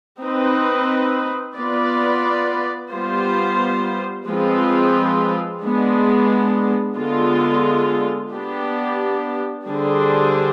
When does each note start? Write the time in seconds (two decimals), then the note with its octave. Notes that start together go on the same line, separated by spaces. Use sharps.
0.22 C4 D#4 B4
1.58 B3 F4 B4 D5
2.92 G3 B3 F4 C5
4.27 F3 G#3 C4 F4 B4
5.63 G#3 B3 D4
6.97 D3 G#3 B3 F4
8.32 B3 D4 G4
9.68 D3 G3 D4 G#4 C5